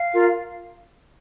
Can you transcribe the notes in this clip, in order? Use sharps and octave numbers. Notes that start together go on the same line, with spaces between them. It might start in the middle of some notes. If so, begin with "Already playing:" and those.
Already playing: F5
F4 A#4